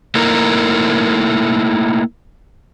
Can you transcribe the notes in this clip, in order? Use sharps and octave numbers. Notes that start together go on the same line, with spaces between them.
A3 A#3 D#4 E4 A#4